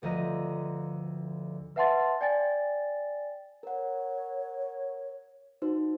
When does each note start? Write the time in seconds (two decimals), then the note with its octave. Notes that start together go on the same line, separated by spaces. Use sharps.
0.02 G1 D2 F3 D#5 A#5
1.76 B4 E5 F#5 A5 C6 A6
2.21 D5 G5 G#5 A6
3.63 A#4 C#5 F#5
5.62 D#4 F#4 C5